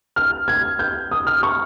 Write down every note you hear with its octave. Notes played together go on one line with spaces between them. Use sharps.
F6
G#6
G6
D#6
F6
C#6